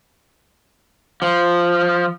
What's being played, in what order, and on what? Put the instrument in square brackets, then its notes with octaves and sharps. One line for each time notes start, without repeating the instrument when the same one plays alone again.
[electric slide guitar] F3